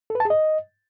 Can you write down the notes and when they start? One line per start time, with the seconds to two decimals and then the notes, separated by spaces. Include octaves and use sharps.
0.10 A4
0.15 B4
0.20 A5
0.25 G#4
0.30 D#5